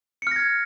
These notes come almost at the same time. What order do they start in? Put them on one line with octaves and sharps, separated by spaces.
C#7 F6 A#6 G#6